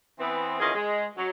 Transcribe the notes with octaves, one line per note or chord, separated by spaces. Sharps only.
E3 B3 C4
D#3 E3 C#4 F4 G#4 D#5
G#3
F#3